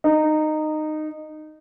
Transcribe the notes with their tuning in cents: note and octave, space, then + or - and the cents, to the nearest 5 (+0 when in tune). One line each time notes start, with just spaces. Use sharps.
D#4 -15